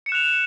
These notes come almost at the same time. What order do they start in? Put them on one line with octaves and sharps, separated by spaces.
C#7 E7 F#6 F7